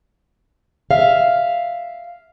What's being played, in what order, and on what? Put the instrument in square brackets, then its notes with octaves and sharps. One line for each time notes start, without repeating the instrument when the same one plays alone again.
[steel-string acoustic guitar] E5 F5